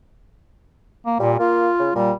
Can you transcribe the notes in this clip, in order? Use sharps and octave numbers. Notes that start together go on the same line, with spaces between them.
A#3
A#2 G3
A#3 F4
C#3
A#2 G3